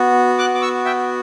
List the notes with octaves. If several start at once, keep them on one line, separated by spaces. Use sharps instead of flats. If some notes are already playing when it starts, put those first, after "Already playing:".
Already playing: B3 F#4
D6 F#6
D6
C#6 E6
E5 G5